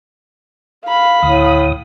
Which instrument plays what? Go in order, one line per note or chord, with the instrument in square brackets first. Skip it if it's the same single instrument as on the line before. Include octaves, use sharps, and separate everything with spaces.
[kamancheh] F5 B5
[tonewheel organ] D2 D#6 [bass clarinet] A2